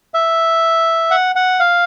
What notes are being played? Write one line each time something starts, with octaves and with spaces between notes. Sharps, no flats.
E5
F#5
F#5
F5